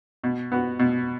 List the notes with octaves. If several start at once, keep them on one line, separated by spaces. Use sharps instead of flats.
B2
B3 F#4
B2